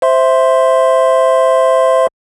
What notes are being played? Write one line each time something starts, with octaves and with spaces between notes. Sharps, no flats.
C5 E5 C6